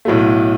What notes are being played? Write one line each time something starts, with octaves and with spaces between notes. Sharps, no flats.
B1 A2 F#3 A3